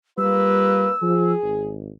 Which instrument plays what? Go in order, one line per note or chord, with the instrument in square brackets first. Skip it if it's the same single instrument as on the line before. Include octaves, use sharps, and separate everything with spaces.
[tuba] G3 [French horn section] A#3 F4 B4 [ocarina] E6
[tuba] F3 [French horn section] G#4
[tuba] G#1